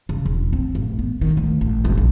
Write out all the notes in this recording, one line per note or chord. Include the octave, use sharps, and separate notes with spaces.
C#3
E1
C4
A1
B3
D#3
D2
A1
E1
B1